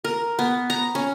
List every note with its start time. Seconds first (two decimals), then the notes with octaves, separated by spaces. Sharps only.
0.04 A#4
0.39 B3
0.70 A#5
0.95 C#4